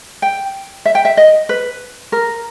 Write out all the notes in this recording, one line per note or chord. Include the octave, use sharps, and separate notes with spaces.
G5
E5
G5
E5
D#5
B4
A#4